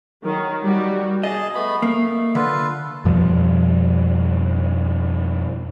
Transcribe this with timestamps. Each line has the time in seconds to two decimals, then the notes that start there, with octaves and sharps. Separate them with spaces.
0.24 D#3 F#3
0.63 G3 F#4
1.23 G#4 D#5 A5
1.55 A3 B3 B5
1.82 A3 A#3
2.35 D3 F4 A4 B4
3.05 F2 B2 F3 G3